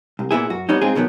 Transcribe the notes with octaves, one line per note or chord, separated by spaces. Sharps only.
C2
A#2 B3 E4 G#4
F#2 F#4
G3 B3 C#4 D#4
G#3 C4 D#4 F4 G#4
B2 D#3 F#3 B3